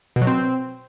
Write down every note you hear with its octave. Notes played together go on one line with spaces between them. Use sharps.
B2
F#3
C4